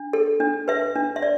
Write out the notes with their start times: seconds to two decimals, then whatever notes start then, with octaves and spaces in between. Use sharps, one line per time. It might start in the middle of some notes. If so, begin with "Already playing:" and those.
Already playing: D4
0.13 A4
0.40 D4
0.68 B4 E5
0.96 D4
1.16 E5
1.22 D5